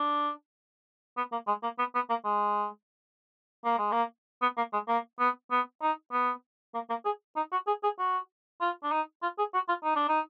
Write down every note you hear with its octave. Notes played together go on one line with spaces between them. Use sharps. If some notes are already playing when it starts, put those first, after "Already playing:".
Already playing: D4
B3
A#3
G#3
A#3
B3
B3
A#3
G#3
A#3
G#3
A#3
B3
A#3
G#3
A#3
B3
B3
D#4
B3
A#3
A#3
G#4
D#4
F#4
G#4
G#4
F#4
F4
D4
D#4
F4
G#4
F#4
F4
D#4
D4
D#4